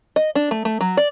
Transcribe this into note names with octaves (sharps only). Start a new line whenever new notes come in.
D#5
D4
A3
A3
F#3
D5